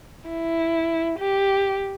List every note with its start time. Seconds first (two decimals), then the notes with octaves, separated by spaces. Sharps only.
0.29 E4
1.18 G4